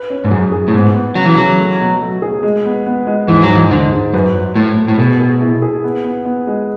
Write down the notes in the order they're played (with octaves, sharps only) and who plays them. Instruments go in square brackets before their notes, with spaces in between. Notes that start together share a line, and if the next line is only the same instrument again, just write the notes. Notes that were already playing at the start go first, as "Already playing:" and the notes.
Already playing: [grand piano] B4
C#4
[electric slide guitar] G#2
[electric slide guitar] F#2 [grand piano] G#4
[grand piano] G#4
[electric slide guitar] A2
[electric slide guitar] G#2 [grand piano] B3
[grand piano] B3
[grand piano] C#3 [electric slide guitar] F#3
[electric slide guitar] E3
[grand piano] C#3 [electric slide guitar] F#3
[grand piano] A3
B2
A3
G#4
G#3
B3
B3
G#3
[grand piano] G#2 [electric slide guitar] E3
[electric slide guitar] F#3
[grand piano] G#2
[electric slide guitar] E3
[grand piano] G#2 [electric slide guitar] D3
[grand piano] G#3
[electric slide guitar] F#2 [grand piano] B4
[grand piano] F#3
[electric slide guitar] A2 [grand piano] A3
[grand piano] A3
[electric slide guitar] A2
[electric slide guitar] B2 [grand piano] G#4
[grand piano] G#4
E4
G#4
B3
B3
B3
G#3